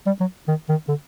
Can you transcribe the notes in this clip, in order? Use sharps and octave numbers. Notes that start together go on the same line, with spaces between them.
G3
F#3
D#3
D#3
D3